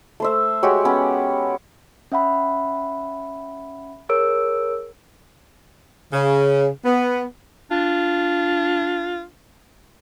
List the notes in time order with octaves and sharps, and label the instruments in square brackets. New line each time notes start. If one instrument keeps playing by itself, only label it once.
[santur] A3 C5 E5
G#3 F#4 G4 C#5
B3 C#4
[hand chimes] C#4 E5 F#5 B5
G#4 A#4 C#5 E6 D7
[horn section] C#3
B3
[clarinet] D4 [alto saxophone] F4